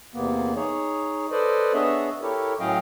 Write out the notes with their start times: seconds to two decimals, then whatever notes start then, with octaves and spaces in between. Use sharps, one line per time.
0.14 E2 C3 A#3 B3
0.56 D#4 G#4 C#5
1.31 A4 B4 C5 D5 D#5
1.74 B3 D4 G#4 C#5 D#5 E5
2.22 E4 G4 A4 A#4 C#5
2.60 A2 F#3 C#4 D#5 F5 G5